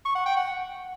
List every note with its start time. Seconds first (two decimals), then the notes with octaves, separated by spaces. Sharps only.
0.05 C#6
0.16 F#5
0.26 G5
0.36 F#5